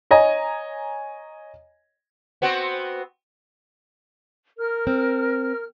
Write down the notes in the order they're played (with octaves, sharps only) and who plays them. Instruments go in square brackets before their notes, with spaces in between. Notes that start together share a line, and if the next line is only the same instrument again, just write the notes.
[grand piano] C#5 D#5 G#5 A#5
[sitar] B3 C4 F#4
[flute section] A#4 F6
[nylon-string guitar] C4